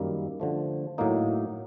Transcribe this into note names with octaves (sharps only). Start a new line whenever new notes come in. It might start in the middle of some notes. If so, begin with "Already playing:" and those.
Already playing: F#2 D#3 G3 A#3
D3 F3 A3
A2 F#3 A#3 D#4